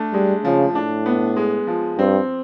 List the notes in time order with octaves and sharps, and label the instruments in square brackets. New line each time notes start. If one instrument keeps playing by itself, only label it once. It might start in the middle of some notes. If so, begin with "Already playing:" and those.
Already playing: [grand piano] A3 D4
[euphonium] G3 [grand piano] G#3
[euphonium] C#3 [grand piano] F3
[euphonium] A2 [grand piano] D4
[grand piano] B3
G#3
F3
[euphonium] G2 [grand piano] C4